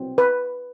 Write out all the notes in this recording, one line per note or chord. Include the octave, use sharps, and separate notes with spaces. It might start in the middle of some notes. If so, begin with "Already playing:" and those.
Already playing: C2 B2 F#3 C4
B4